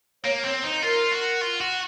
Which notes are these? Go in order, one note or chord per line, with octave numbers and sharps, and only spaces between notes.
A#3 C#5
C4 C#5
D#4 C5
F4 A#4
F#4
F4
F#4